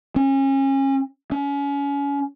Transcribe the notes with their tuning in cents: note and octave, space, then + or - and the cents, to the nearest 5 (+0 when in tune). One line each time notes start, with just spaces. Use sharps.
C#4 -30
C#4 +30